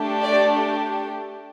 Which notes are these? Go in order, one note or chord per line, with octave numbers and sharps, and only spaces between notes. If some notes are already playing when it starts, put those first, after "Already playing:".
Already playing: A3 D4 G4
D5